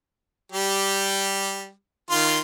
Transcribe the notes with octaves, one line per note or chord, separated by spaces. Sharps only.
G3 G4
D#3 F4 C6